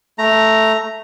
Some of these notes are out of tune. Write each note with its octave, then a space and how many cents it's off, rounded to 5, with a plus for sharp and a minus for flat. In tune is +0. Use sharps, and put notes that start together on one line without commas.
A3 +0 A#5 +0